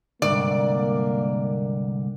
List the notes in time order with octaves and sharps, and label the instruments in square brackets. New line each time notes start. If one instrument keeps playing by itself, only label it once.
[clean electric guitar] C2 G#2 D3 [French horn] A#3 [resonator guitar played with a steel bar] D5